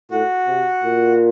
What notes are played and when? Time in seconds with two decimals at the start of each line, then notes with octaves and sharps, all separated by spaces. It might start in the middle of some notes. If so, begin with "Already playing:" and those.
0.11 A2 F#4
0.47 C3
0.83 A#2